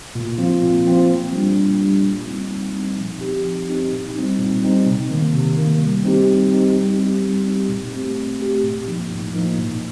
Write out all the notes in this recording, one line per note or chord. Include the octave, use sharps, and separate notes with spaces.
A#2
F3 C4 F4
A#2
F3 C4 F4
A#2
G3 D4
A#2
G3 D4
A#2
G3 C4 D#4
A#2
G3 C4 D#4
F3
C4 D#4 G4
F3
C4 D#4 G4
A#2
G3 C4 D#4
A#2
G3 C4 D#4
C3
D#3 A#3
C3
D#3 A#3
G3
C4 D#4 G4
G3
C4 D#4 G4
G3
C4 D#4 G4
G3
C4 D#4 G4
A#2
A3 C4 G4
A#2
A3 C4 G4
A2
F3 A#3 D#4
A2
F3 A#3 D#4
A#2